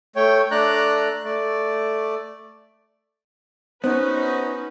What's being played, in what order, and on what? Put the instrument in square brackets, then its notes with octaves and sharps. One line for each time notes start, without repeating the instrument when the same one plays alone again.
[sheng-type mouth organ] A3 C#5 G5
A3 D4 D5 A#5 F#6
A3 D5
[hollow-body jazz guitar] B3 [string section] C#4 F#4 B4 [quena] D#4 [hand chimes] C5